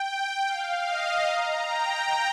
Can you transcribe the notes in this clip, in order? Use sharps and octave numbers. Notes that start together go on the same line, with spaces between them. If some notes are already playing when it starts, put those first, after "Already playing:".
Already playing: G5
F5
D#5
A#5
G5